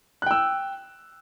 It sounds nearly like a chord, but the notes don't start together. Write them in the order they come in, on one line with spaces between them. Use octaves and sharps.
F#6 G5 E6